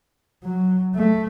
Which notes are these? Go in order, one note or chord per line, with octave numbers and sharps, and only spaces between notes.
F#3
A3